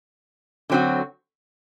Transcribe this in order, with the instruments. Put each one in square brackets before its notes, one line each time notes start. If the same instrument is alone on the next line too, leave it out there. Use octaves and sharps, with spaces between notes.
[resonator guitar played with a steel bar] D3 F#3 C4 F#4